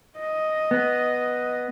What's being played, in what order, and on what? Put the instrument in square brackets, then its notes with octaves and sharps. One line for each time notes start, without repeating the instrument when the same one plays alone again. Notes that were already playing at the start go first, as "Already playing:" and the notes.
[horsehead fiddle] D#5
[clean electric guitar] B3